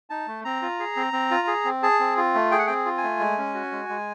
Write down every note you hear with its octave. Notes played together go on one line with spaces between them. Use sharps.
D#4 A5
A3
C4 A#5
F4
G#4
C4
C4
F4
G#4
C4
G#4 A5
C4
F4
A3
G#4 G5
F#5
C4 G5
F4
G#5
A3
G#3
C#4
F#4
G#3
G#3